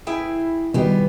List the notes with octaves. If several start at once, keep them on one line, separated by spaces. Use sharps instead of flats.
E4 G#4 G5
B2 D#3 G3 G#3 B3 G4